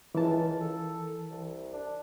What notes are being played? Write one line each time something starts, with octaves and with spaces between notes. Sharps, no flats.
C#2 E3 A#4 A5
A4
C2
D4